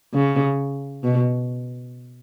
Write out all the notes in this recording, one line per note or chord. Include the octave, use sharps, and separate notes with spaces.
C#3
B2